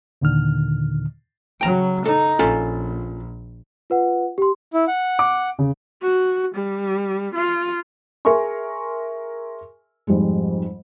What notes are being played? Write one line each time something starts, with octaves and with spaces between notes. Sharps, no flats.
D#2 A#2 D3 D#3 F6
C#3 F#3 G5 A#5
D#4 A4
A#1 C#4 F4 A4
F4 B4 F#5
G4 C6
E4
F#5
D6
C#3
F#4
G3
F4
G#4 A#4 E5 G#5 C6 C#6
F2 G#2 G3 G#3